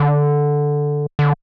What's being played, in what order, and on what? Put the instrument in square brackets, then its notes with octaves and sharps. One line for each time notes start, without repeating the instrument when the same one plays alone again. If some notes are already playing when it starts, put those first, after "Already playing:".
Already playing: [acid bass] D3
D3